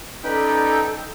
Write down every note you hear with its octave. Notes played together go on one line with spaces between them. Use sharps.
C#4 D#4 A4 B4 D5 G5